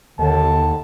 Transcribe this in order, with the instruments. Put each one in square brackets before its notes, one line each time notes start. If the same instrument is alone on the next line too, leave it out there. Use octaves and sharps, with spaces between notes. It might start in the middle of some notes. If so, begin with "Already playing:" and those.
[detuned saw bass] D#2 [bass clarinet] D3 [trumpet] A5